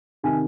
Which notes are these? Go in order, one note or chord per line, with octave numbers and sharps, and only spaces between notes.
C3 D#3 G#5